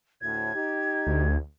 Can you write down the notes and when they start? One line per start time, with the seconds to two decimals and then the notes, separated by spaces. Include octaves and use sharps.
0.21 D2 A2 G#6
0.55 D#4 G4
1.07 D2